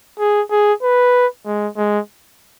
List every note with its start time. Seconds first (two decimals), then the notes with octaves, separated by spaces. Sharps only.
0.20 G#4
0.51 G#4
0.83 B4
1.46 G#3
1.77 G#3